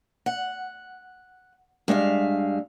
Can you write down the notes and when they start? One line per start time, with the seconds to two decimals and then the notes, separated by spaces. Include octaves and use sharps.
0.26 F#5
1.88 G2 G#3 E5 F5